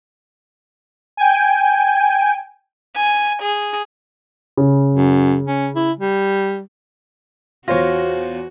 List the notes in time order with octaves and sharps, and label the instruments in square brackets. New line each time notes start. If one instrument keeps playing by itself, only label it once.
[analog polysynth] G5 G#5
[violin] G#5
G#4
[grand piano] C#3
[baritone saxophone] F#2
C#4
E4
G3
[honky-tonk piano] E2 C5 A#6 [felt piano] F4 C#5 [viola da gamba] F#4